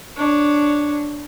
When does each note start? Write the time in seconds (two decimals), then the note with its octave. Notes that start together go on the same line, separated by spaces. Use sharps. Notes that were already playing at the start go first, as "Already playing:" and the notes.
0.17 D4 C#5